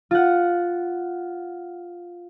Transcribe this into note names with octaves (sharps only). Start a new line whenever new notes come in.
F4 F#5